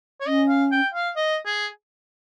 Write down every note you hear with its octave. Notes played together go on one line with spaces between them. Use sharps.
C#5
C#4 D#5
F5
G5
F5
D#5
G#4